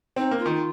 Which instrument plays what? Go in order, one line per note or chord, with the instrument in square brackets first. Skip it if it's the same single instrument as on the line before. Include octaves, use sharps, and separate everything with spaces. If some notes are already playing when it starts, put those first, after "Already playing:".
[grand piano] C4 [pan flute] D#4
[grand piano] A#3
[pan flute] F4
[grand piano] D#3